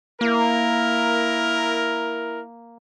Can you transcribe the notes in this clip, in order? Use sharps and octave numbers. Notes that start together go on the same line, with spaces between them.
A#3 E4 A#4